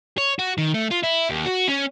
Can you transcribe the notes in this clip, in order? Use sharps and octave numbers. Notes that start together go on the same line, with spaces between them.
C#5
F#4
D#3
A3
F4
E4
D#2
F#4
C#4